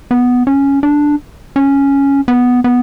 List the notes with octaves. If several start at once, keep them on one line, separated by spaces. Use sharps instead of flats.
B3
C#4
D4
C#4
B3
B3